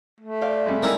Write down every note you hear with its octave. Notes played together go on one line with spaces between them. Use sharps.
A3
C5 D5 F5
C3 G3 G#3
G3 G#3 A#3 C4 D#4 E4 A#4 E6